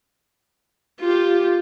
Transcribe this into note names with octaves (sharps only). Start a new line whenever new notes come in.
F4 G4